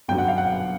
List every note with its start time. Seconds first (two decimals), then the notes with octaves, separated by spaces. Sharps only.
0.08 G1 F#2 D3 F#3 G5
0.18 F#5
0.28 F5
0.38 F#5